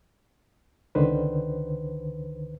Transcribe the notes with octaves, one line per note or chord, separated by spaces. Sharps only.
C#2 D3 D#3 B4 C5